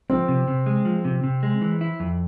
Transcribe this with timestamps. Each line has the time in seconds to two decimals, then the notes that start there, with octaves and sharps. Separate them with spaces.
0.10 F3 C4
0.28 C3
0.48 C3
0.66 G#3
0.85 F3
1.05 C3
1.24 C3
1.43 G#3
1.61 E3
1.81 E4
2.00 F2